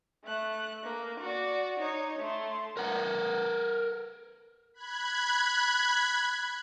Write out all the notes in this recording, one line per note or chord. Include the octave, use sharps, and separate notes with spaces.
A3 F#6
A#3
F#4 D5
D#4 C#5
A3 C6
A#4 B4 F#5
B5 F#6 G#6